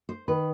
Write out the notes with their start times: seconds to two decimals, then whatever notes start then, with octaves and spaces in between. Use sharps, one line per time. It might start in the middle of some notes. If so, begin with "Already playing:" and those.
0.09 C5
0.28 D#3 B4